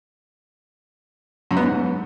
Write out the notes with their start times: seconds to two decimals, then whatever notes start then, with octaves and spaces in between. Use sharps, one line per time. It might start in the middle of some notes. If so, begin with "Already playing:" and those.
1.51 F#2
1.57 B3
1.63 G#2